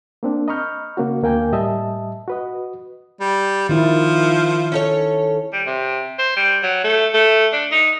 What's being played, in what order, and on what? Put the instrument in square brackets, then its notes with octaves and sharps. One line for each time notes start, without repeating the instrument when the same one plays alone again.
[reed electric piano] A#3 C4 D4
D#5 A#5 B5 C#6 F6 G6
C#3 A#3 C#4 F#4
D2 A#3 G5 G#5 G6
A2 G3 D#5 E5 A5
F#4 B4 D#5
[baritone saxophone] G3
[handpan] D#3 E4 [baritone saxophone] F3
[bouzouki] C#4 A4 C#5
[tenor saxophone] G3
C3
C5
G3
F#3
A3
A3
D4
D#4